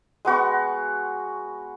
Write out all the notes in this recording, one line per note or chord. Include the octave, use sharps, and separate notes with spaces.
G#3 B3 F#4 C#6